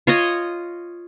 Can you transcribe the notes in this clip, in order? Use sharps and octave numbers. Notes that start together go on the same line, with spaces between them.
F4 C#5 D#5